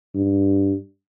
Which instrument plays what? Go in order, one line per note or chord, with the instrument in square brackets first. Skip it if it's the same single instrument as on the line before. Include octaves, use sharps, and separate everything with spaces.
[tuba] G2